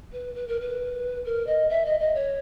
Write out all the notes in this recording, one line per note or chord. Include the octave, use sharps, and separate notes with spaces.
B4
B4
A#4
B4
A#4
D#5
E5
D#5
D#5
C#5